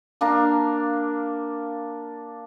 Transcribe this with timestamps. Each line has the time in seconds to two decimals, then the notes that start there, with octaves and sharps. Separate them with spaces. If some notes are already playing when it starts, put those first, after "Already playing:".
0.21 A#3 D4 F5 A#5